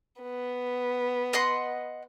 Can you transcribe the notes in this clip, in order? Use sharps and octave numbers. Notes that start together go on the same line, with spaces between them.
B3
D#5 F#5 C6